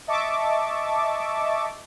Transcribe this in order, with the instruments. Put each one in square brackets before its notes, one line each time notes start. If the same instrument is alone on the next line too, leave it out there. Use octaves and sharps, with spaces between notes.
[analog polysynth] D#5 E5 A5 C#6 D6